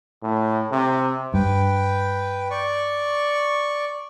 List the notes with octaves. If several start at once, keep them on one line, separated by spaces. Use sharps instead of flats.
A2
C3
G2 B4 G5
D5 C#6